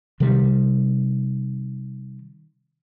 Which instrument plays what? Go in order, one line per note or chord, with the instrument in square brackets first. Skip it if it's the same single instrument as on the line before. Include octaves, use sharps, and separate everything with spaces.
[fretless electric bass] C3 D#3 G3